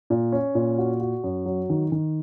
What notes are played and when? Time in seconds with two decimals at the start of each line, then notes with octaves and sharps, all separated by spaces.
0.10 A#2
0.32 C#4
0.55 A#2
0.78 F#4
1.00 F#4
1.24 F#2
1.46 F#3
1.70 D#3
1.92 D#3